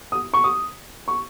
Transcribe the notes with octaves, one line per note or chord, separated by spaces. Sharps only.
D#6
C#6
D#6
C#6